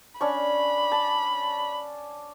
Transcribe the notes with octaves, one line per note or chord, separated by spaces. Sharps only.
C#4 D4 B5 C#6
A5